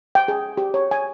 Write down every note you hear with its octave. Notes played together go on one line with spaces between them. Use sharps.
G5
G#4
G4
C#5
G#5